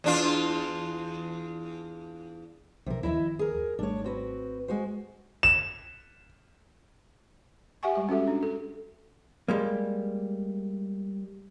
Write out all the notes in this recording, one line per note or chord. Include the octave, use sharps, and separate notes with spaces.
E2 D4 F4
B1 C3 E3 F3 A#4
F#1 D#2 F3 E4 D#5 E5
G#4 A#4
G#1 G3 A3 D4 C#5
C4 F#4 B4
G#3 F#4 C5
E7
G4 E5 F#5 G#5 C#6
G3 G#3 G4
C#4 F#4 A4 E5
D4
A4
G3 G#3 A#3